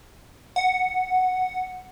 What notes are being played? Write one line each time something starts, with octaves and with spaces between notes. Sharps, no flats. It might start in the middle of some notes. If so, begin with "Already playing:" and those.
F#5